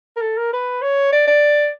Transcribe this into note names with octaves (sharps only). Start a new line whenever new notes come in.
A#4
A4
A#4
B4
C#5
D5
D5